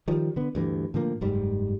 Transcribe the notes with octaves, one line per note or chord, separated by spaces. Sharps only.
D#3 F3 G3
D3 B3
D2 G2 E3
A2 D3 F3 A#3
F#1 G#2 G3